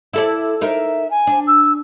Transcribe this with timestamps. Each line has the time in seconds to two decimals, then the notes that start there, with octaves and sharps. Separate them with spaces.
0.13 E4 A4 D5
0.61 D#4 A#4 E5
1.11 G#5
1.27 D4
1.47 E6